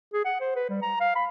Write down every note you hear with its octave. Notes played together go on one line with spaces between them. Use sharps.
G#4
F#5
C5
B4
G3
A#5
F5
B5